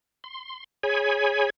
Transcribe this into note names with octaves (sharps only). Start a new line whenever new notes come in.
C6
G#4 C#5 G#5 B5